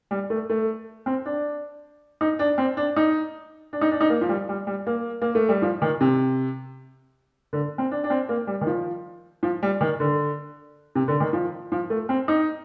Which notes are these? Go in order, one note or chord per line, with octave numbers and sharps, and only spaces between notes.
G3
A3
A3
C4
D4
D#4
D4
C4
D4
D#4
D4
D#4
D4
D#4
A#3
F3
G3
G3
G3
A#3
A#3
A3
G3
F3
D#3
C3
D3
C4
D4
D4
C4
A#3
G3
D#3
F3
F3
G3
D#3
D3
C3
D3
D#3
F3
F3
A3
C4
D#4